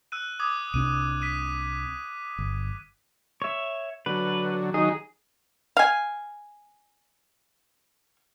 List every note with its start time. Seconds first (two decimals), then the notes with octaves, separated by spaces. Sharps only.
0.12 E6 F#6 D#7
0.40 D6 D#6 G#6
0.74 C2 C3 D4 D#7
1.22 B6 D#7
2.39 G1
3.42 C#5 E5
4.06 D3 F#3 B4
4.74 D#3 F#3 D#4 G#4
5.77 F5 G#5